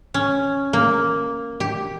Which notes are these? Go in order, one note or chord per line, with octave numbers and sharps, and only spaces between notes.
C#4
A#3
G4